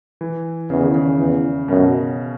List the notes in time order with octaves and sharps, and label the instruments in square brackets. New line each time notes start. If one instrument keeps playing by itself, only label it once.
[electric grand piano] E3
[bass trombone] E2 [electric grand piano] C#3
[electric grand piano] D#3
C#3
[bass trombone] E2
[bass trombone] F#2 [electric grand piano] B2